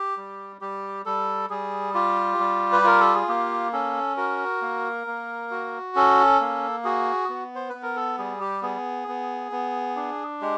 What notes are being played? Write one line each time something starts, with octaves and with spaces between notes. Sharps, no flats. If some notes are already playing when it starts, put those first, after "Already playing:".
Already playing: G4
G3
G3 G4
G3 A4
G3 G#4
F4 G4
G3
B4
F4 A#4
A4
G#4
A#3 G4
C#4 A4
F#4 A#4
A#3
A#3
F#4
C#4 A4
A#3
F#4 G#4
B3
C5
B4
B3
A#4
A4
G3 G#4
G4
B3 G#4
B3
B3
D4
G#3 G4